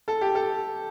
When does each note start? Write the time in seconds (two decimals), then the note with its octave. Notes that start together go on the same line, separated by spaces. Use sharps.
0.08 A4
0.21 G4
0.35 A4